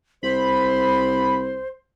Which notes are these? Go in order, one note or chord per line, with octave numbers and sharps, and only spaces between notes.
C2 C5 B5